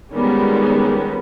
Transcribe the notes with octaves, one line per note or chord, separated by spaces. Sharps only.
D#3 F3 G3 G#3 B3 C#4